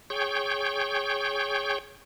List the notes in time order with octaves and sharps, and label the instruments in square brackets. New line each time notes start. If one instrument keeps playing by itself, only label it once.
[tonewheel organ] G#4 C#5 G5 C#6 G6